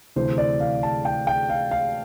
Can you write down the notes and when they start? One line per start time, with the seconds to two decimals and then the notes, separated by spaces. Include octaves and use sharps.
0.16 D2 C3 E3 A3 C5
0.38 D5
0.60 F5
0.83 A5
1.05 G5
1.27 G5
1.50 F5
1.71 F5